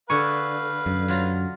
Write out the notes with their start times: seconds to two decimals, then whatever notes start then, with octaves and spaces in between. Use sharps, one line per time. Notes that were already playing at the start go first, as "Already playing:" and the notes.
0.10 D3 B4 F5 G#5 C#6
0.86 F#2
1.08 F#3 F4 A#5